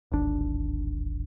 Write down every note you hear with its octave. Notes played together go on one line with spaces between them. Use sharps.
D1 G#1 D4